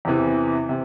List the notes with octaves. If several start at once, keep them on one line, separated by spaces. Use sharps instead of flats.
E2 C3 E3
C3